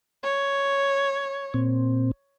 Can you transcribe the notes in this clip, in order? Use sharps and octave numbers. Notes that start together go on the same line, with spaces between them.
C#5
A#2 C4